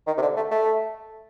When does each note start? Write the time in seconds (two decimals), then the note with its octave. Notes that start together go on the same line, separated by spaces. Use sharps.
0.07 D#3
0.17 C3
0.22 D3
0.36 A3
0.51 A3